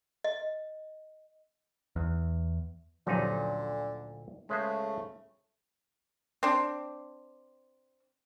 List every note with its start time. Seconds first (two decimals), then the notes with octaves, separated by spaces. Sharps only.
0.24 D#5
1.96 E2
3.07 D2 A#2 D3 F3 F#3 D#4
4.49 C#3 G#3 A3 B4 C5
6.43 C4 D4